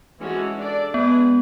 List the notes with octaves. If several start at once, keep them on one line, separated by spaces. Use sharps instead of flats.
E3 G#3 C#4 F#4 A4
D4 A4 D5
G#3 B3 D4 G#4 B4